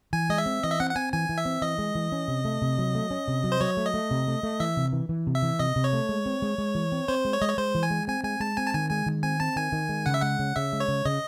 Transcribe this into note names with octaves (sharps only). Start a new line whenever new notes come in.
E3 G#5
G#3 D#5
E5
C4
E3 D#5
E5
C4 F#5
F#5
C4 G#5
E3 G#5
E3
E5
C4
E3 D#5
G#3
E3
C#4
C3
A3
C3
F#3
A3
C#4
C3
F#3
C5
F#3 C#5
A3
D#5
A3
C3
A3
A3
E3 E5
C3
E3
E3
C3
E5
E3
C3 D#5
C3
C#5
A3
G#3
C4
G#3
G#3
E3
C4
C4 C5
G#3
C#5
G#3 D#5
C#5
G#3 C5
E3
G#5
G#3
C4 G#5
G#3 G#5
G#3 A5
C4 G#5
A5
D#3 G#5
G#3 G#5
D#3
C4 G#5
C4 A5
D#3 G#5
D#3
G#3
C#3 F#5
E5
G#3 F#5
C#3
C#3 E5
G#3
C#5
C#3
C#3 D#5